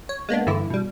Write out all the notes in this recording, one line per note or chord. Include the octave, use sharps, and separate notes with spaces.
C#5
G#3 A#3 B3 D4
G2 D3 E3 E4
B2 G3